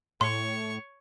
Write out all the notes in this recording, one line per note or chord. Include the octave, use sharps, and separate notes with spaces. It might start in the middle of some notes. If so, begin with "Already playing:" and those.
A2 C#5 C6 C#6